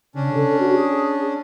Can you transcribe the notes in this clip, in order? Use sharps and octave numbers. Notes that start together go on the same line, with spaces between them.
C#3 C#4 D4
A4
F#4
G#4